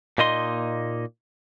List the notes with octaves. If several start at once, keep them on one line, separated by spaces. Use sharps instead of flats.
A#2 A#3 D#4 D#5 C6